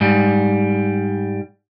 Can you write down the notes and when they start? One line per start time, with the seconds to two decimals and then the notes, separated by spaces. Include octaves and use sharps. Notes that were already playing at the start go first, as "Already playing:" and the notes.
0.01 G#2 G3